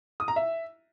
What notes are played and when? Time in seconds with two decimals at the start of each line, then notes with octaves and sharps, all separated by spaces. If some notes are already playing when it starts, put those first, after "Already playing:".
0.20 D#6
0.28 A#5
0.36 E5